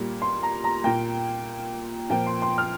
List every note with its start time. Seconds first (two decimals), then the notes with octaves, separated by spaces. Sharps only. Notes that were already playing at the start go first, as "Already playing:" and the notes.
Already playing: A#2 G3 A#3
0.22 C6
0.43 A#5
0.64 A#5
0.84 A#2 A#3 G5
2.10 A#2 F3 A#3 G5
2.27 C6
2.42 C6
2.58 F6